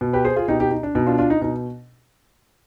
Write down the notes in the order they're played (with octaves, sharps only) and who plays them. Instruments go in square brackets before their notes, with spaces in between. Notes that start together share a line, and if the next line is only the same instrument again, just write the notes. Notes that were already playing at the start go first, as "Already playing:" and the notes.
[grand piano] B2
G4 B4
G#4 C5
F4 G#4
B2 D#4 G4
D#4 G4
D#4
D4
B2 D#4
D4 F4
D4 F4
D#4
B2 D#4